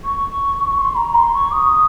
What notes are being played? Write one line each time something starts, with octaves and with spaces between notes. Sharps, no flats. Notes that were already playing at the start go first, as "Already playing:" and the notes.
C#6
C6
A#5
C6
C#6
D#6